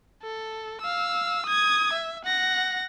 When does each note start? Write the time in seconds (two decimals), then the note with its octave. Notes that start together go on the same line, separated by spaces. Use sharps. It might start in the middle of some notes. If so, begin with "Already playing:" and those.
0.22 A4
0.81 F5 E6
1.46 D#6 G#6
1.93 E5
2.25 F#5 A#6